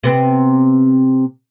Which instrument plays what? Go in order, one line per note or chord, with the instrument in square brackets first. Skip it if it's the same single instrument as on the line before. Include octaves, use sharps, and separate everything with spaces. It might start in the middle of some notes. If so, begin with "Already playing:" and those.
[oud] C3 B3 C4